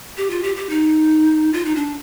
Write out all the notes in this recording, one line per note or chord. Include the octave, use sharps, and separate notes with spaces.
G4
F4
G4
G4
D#4
F4
D#4
D4